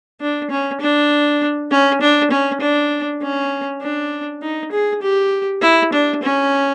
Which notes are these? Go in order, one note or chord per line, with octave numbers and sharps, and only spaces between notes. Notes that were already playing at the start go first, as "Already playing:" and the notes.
D4
C#4
D4
C#4
D4
C#4
D4
C#4
D4
D#4
G#4
G4
E4
D4
C#4